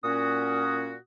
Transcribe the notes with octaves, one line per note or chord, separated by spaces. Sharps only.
A#2 C#4 F#4 D#6